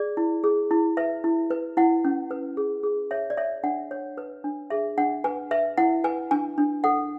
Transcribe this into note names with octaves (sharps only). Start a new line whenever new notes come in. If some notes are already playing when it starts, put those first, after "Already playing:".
Already playing: G#4 D5
E4
G#4
E4
B4 E5
E4
B4
E4 F#5
C#4
B4
G#4
G#4
C#5 E5
D5
C#5 E5
D4 F#5
C#5
B4
D4
G#4 E5
D4 F#5
B4 G#5
B4 E5
E4 F#5
B4 G#5
D4 G#5
D4
A4 F#5